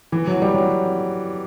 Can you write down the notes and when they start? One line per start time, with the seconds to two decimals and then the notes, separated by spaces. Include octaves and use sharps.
0.12 E3
0.27 F#3
0.42 G3
0.54 F#3